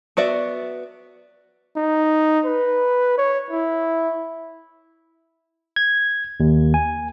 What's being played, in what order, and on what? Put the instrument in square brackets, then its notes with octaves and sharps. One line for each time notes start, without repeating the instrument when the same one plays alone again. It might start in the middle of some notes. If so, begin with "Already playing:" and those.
[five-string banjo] B3 F#4 D5 E5
[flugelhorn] D#4
B4
C#5
E4
[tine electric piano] G#6
D#2
G#5